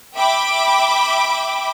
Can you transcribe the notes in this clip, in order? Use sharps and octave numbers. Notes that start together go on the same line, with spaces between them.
E5 G5 B5 D6